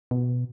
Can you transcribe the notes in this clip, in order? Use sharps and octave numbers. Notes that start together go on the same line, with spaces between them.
B2